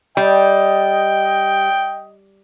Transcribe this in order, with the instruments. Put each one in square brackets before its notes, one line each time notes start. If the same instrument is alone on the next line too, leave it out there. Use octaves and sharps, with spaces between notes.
[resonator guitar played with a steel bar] G3 [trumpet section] D#5 [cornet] G5